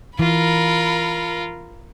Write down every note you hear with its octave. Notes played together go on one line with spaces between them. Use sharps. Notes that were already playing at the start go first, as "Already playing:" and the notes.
E3 F4 A#4 B5